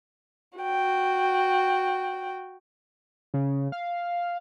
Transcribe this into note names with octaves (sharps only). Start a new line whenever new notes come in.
F#4 G5
C#3
F5